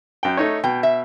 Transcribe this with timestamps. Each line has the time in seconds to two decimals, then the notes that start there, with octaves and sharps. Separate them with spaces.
0.23 F#2 G5
0.37 A3 D#4 C#5
0.64 B2 G5
0.83 E5